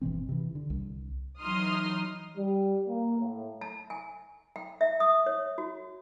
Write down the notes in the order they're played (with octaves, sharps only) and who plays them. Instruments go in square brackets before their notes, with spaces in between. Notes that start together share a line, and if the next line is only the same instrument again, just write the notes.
[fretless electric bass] G1 B2 E3 C4
C3 E3
D3
C2
[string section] E3 F#3 D#4 C6 D#6 F6
[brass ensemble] G3
A#3
A2
[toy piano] A5
G#5
G5
E5
D#6
C#5
F#4